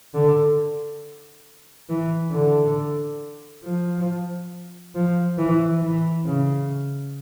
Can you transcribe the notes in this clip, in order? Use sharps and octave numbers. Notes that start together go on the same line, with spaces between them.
D3
E3
D3
F3
F3
E3
E3
C#3